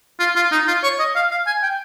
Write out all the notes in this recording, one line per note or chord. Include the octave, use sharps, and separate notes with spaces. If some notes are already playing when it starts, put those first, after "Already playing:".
F4
F4
D#4
F4
C#5
D#5
F5
F5
G#5
G5